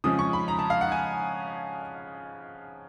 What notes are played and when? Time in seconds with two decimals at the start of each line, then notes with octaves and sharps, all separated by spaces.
0.04 C#3 F3 G#3 D#6
0.19 C#6
0.33 B5
0.48 A#5
0.59 A5
0.70 F5
0.81 F#5
0.92 G#5